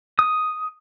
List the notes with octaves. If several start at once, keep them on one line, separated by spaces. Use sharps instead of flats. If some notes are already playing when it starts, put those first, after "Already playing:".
D#6